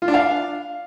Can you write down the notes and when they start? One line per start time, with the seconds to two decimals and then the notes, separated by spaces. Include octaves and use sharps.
0.02 F4
0.08 D4
0.14 F5